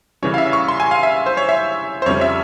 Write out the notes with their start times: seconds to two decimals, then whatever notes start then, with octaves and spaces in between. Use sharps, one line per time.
0.22 C#3 E3 G3 C#4 C#5
0.34 F5
0.38 E5
0.53 C#6
0.68 C6
0.80 G#5
0.91 F5
1.03 E5
1.26 C5
1.37 C#5
1.49 E5
2.02 C5
2.06 F2 C#3 G3 C#4 C#5
2.21 E5